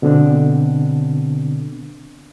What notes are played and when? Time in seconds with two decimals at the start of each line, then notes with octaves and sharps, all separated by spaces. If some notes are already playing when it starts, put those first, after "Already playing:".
0.02 B2 D3 B3 C4 D4